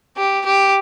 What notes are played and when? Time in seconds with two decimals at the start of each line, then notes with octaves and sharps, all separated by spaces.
0.17 G4
0.46 G4